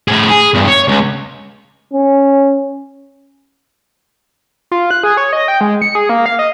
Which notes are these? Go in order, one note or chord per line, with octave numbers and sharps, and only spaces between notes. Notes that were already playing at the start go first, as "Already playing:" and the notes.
A2 G#4
G#4
E2 G2
C#5
C#2
C#4
F4
F#6
G#4
C#5
D#5
G5
G#3
C#7
G#4
A#3
F5
D#5